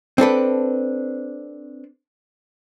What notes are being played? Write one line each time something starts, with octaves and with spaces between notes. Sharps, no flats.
C4 D4 A4 B4